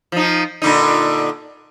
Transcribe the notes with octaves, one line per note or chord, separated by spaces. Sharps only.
F3 D#4
A#2 D3 D#4